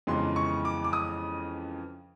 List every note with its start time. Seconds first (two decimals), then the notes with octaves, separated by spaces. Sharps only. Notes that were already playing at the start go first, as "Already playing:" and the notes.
0.07 F2 C#3 E3 G#3 B3 C6
0.36 C#6
0.65 D6
0.84 D6
0.93 D#6